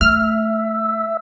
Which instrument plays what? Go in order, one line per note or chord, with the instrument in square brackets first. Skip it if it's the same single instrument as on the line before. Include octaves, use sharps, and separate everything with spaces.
[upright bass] A3 [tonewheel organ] E5 [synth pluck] F6